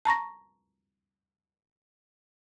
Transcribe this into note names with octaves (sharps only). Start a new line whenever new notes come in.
A5 A#5 C#6 A#6